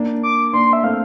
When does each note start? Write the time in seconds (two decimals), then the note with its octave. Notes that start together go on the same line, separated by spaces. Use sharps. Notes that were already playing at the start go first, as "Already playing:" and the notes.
Already playing: A#3 D4
0.23 D6
0.53 A#3 D4 C6
0.73 E5
0.83 A3 C4 F5